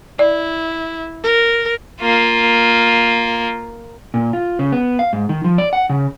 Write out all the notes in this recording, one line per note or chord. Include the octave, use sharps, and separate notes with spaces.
E4 D5
A#4
A#3 F4
A#2
F4
C#3
B3
F5
G#2
D#3
F3
D5
F#5
C#3